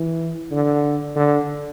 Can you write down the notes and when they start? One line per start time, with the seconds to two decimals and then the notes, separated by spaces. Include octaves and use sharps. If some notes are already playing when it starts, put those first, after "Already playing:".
Already playing: E3
0.52 D3
1.16 D3